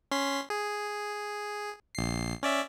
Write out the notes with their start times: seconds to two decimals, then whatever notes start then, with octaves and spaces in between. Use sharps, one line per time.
0.11 C#4 C6 B6
0.50 G#4
1.95 A#1 C7
2.43 C#4 D5 E5